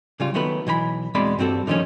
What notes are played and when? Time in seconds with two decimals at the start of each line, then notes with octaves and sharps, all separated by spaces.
0.20 C#3 G3 F4
0.34 D#3 F#3 A3 B3 B4
0.67 B1 E3 C5 B5
1.15 E2 B2 G#3 C4 D5 B5
1.39 G2 G3 C4 F#4 A4
1.67 D3 D#3 F3 G3 C#4